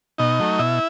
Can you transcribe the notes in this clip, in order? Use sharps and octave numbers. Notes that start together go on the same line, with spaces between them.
B2 D#4 D#5
F#3 A3
B2 E4 E5